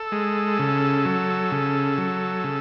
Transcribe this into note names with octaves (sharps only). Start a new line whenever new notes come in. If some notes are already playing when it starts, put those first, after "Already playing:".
Already playing: A4
G#3
C#3
F#3
C#3
F#3
C#3